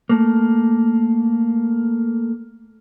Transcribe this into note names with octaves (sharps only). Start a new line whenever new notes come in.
A3 A#3